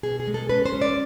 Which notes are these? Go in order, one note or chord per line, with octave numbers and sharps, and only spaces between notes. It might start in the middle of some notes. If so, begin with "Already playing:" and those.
B2 G#4
G#4
G#3
A4
C#4 B4
C5
C#4
D5